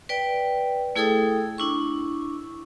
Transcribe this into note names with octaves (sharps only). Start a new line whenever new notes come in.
B4 D5 G5
A3 E4 G#4 A4 G5 D#6
D4 E4 C#6